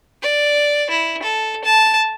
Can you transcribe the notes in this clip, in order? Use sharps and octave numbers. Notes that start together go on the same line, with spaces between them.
D5
E4
A4
A5